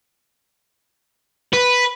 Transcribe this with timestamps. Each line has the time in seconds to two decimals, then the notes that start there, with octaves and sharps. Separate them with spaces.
1.53 B4